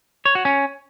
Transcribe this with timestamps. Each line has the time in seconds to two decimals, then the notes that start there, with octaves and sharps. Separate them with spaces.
0.25 C#5
0.35 F#4
0.45 C#4